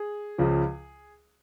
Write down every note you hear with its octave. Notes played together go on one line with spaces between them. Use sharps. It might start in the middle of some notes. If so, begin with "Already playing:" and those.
Already playing: G#4
C#2 C#3 F3